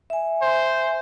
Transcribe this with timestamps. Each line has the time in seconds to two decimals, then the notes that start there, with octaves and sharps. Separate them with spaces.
0.10 E5 G#5
0.42 C5